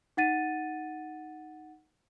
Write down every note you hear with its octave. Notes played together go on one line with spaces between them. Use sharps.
D#4 F#5 A6 D#7